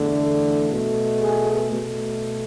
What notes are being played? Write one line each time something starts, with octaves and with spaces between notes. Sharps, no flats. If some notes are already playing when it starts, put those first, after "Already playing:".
Already playing: E2 D3 A3
B2 A3
G#4
B2 A3